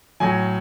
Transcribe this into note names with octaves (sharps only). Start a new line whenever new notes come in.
A2 F#3 G#5